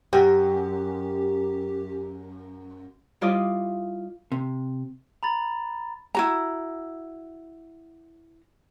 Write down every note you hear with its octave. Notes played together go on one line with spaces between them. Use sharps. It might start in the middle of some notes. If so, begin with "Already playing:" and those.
F#2 G4
G3 E4 F4 D5 D#5
C3
A#5 B5 A6
E4 F#4 A#5